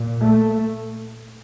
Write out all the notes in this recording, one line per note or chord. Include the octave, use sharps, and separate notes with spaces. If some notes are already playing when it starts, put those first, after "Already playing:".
Already playing: A#2
A3